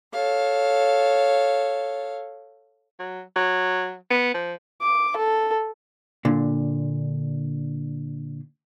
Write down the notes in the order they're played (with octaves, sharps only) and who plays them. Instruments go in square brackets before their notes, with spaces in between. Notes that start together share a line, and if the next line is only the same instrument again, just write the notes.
[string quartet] A4 C#5 F5
[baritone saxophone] F#3
F#3
B3
F3
[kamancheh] D6
A4
[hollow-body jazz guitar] A#2 D3